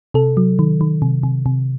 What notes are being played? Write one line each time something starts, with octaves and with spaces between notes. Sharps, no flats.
C3 A4
F#3
D#3
D#3
C3
C3
C3